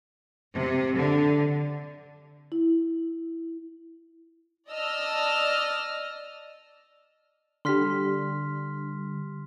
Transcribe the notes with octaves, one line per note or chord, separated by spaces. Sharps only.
C3
D3
E4
D5 D#5 A5 E6 F6
D3 G3 C6 F6 B6